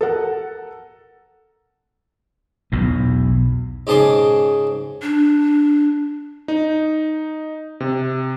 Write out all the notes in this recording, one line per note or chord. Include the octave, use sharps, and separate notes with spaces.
A4 A#4 F#5
B1 E2 B2
G#2 C#3 G#4 A5 C6 D6
D4
D#4
C3